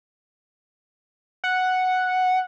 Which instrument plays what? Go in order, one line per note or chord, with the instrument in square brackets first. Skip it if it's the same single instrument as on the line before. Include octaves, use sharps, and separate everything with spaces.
[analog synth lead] F#5